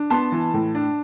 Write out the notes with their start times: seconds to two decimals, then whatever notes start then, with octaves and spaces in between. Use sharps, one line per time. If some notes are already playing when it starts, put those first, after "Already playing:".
Already playing: D4
0.10 B3 A5 C6
0.32 E3
0.54 A2
0.75 D4